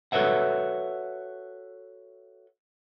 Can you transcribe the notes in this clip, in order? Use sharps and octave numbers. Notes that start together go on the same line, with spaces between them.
F#4 A4 B4 C#5 E5 F#5